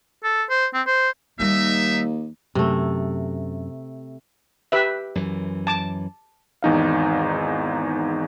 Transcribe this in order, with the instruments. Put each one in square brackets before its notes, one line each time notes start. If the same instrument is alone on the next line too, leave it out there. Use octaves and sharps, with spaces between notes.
[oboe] A4
C5
C4
C5
[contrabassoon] D#2 [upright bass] G3 A#3 [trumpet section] D#4 E5
[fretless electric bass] F#2 [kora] C3 A3
[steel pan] G4 B4 E5
[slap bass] F#2 E3
[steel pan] A5 D6
[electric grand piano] G#1 E2 D#4 F5